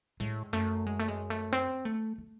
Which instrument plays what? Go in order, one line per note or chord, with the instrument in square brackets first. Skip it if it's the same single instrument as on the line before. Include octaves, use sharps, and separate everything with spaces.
[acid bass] A2 [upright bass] G#3
[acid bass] F#2 [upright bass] A3
[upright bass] G#3
A3
G#3
A3
C4
A3
A3